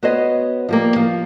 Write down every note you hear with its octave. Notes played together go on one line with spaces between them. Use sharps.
B3 F#4 C5 C#5 D#5
F3 G3 A#3
F3 F4